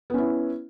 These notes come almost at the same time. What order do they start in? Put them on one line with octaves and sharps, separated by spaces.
B3 C#4 E4